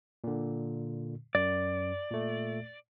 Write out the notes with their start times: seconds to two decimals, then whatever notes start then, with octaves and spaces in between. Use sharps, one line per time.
0.24 A#2 D3
1.35 F#2 D5
2.11 A#2 A3